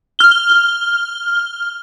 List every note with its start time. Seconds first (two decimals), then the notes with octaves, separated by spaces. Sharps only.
0.19 F6 G7